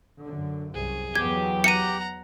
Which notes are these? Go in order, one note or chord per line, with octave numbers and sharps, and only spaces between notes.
F#2 D3
C2 F#2 G#4
E2 F#3 B3 G4 G#6
F#5 A#5 C#7 D#7